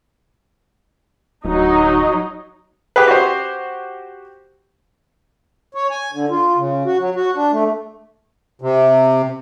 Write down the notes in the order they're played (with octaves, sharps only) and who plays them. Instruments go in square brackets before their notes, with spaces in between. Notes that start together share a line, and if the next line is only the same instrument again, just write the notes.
[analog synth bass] D1 [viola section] F#3 D#4 D#5
[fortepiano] G4 G#4 B4
F#4 G4 C5
[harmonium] C#5
G#5
D3
F4
C#3
F#4
F#3
F#4
D4
A3
[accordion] C3